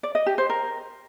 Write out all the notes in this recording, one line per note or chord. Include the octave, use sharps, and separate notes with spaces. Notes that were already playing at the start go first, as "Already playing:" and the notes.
D5
D#5
G4
C5
A#4